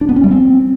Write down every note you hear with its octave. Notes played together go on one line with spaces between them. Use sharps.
D4
B3
C#4
G3
C4